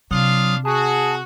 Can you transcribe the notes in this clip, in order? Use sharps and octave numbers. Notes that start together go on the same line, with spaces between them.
C3 F#3 D4 F4 F5 D#6
F#4 G#4 A5